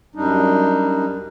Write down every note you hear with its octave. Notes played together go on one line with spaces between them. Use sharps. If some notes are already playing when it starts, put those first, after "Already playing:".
F#2 G3 D4 D#4